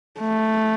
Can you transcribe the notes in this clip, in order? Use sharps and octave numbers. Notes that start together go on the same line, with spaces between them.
A3